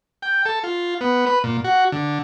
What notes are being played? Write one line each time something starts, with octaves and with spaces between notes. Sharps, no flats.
G5
A4
F4
B3
B4
A#2
F#4
D3